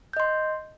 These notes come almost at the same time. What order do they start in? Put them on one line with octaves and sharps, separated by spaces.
G6 D#5 C6